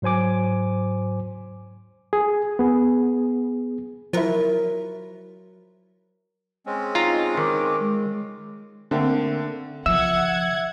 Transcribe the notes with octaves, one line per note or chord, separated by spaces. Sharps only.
G#2 F#3 C5 G#5 D6
G#4
B3 G#4
F3 F#3 E4 A#4
G#3 C4 C#4
D#4 F4 A#5
D#3 D6
G#3
D3 A3 A#3 C4
C#3 F3 E5 F#5 E6 G#6